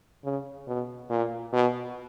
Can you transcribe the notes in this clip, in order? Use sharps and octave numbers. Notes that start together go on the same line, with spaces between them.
C#3
B2
A#2
B2